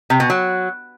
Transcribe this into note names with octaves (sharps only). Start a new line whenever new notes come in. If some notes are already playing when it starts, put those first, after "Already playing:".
C3
B2
F#3